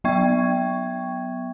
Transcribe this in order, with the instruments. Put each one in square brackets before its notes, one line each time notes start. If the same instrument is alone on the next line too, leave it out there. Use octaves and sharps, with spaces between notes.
[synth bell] F#3 B3 E5 G5 C#6 G#6